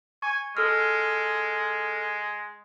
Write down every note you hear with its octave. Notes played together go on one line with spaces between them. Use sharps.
G#5 C#6
G#3 A4 E6 F6